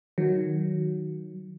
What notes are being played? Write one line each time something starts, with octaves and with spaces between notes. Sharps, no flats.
D#3 F#3